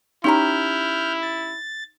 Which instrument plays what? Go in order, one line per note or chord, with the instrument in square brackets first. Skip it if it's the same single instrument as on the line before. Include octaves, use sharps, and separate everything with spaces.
[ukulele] C#4 G4 A#5 [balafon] D#4 [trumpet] E4 [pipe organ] F6 G6
[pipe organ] A6